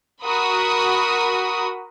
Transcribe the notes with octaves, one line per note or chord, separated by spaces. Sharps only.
F#4 A#4 B5 D#6